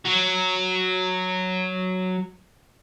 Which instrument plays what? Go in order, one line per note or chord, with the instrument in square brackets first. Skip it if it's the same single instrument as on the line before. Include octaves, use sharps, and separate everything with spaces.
[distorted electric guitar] F#3 F#4